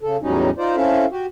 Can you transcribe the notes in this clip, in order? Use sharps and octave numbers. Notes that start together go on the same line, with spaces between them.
C#3 A4
E2 A2 F#3 G3 C#4 D#4
D#4 F4 C5 D5
C4 C#4 E4 A4 E5 F5
F#4 G4